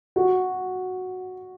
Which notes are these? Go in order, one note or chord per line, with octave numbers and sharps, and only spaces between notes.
F#4